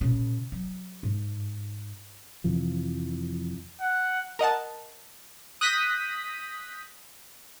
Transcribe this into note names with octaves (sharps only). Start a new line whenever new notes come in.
A#2 C#3
F#3
G#2
F2 C3 E3 F3
F#5
A#4 D#5 F#5 A5
D#6 F#6 G6 A#6 B6 D#7